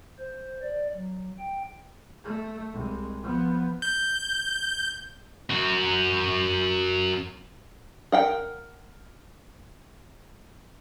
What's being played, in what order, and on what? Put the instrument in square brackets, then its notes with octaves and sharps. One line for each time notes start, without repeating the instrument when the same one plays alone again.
[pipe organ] C5
D5
F#3
G5
[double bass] A3
C2 G#3
F3 B3
[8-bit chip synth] G6
[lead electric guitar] F#2 F#4
[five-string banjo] A#4 F#5 G5